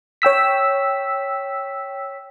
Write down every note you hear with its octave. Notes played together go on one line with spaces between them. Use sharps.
C#5 G5 E6 B6